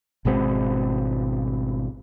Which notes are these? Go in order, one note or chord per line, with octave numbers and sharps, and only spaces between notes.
G#1 B2 G#3 C4